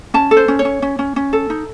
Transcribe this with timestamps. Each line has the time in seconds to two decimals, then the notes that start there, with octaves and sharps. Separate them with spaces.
0.14 C#4 A5
0.31 A4
0.37 C5
0.48 C#4
0.59 C#5
0.65 C#4
0.82 C#4
0.99 C#4
1.16 C#4
1.33 A4
1.50 D#4